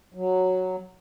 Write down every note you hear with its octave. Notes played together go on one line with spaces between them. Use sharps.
F#3